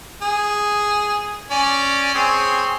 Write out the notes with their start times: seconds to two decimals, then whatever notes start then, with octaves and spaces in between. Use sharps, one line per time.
0.22 G#4
1.51 C#4 D5
2.14 C4 G#4 C#5